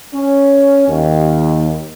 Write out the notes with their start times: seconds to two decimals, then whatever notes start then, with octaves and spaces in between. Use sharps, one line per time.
0.13 C#4
0.88 D#2